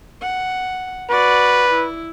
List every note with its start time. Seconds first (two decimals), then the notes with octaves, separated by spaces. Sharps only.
0.22 F#5
1.10 F#4 B4 D5
1.69 E4